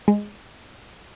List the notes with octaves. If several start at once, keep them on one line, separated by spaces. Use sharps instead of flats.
G#3